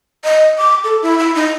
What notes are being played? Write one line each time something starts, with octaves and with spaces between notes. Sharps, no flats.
D#5
D6
A4
E4
E4
D#4